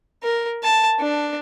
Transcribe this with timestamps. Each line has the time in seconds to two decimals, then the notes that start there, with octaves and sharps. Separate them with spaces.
0.23 A#4
0.63 A5
0.99 D4